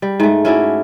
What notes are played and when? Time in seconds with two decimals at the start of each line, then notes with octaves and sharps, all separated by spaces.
0.02 G3
0.20 G#2 A3
0.45 C#4 E4 F#4 D5